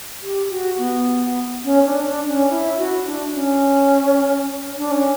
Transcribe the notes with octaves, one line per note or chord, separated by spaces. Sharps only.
G4
F#4
B3
C#4
D4
D4
C#4
E4
F#4
D4
C#4
D4
C#4